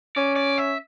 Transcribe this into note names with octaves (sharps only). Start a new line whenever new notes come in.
C#4 D5
D5
E5